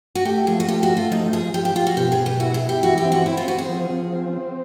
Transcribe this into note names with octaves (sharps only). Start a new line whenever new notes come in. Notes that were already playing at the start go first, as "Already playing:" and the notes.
F#4
A3 G4
F3 G#4
F#4
A3 G4
F#4
A3
F4
F3 D#4
F3 G#4
F3 G4
G4
F3 F4
F#4
B2 G4
G#4
B2
G4
E4 F#4
G#4
E4
G4
E3 F#4
G4
C4
F#4
C4 E4
F4
C4 F#4
G#4
F3
F3
C4
C4